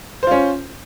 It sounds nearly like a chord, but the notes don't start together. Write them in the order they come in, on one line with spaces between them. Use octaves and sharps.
C5 F4 C#4